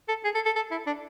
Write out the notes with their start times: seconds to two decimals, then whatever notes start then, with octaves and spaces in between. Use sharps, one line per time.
0.09 A4
0.24 G#4
0.35 A4
0.45 A4
0.56 A4
0.71 E4
0.86 D4